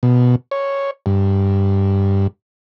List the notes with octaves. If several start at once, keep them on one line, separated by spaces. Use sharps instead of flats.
B2
C#5
G2